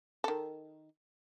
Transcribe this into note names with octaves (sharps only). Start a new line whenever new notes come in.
D#3 A4